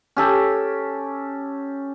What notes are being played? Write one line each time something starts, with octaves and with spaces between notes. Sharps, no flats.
C#4 G4 A4